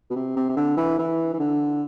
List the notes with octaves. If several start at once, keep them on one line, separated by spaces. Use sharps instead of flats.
B2
C3
C3
C3
D3
E3
E3
E3
D3